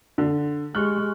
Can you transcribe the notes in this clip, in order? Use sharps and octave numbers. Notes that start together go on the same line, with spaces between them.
D3
G#3 G4 C#6 F6 F#6